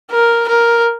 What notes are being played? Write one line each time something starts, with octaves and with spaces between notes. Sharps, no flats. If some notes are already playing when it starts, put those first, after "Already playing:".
A#4
A#4